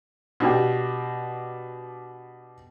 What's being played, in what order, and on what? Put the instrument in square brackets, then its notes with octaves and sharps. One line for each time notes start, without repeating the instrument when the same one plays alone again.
[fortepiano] B2 D4 G4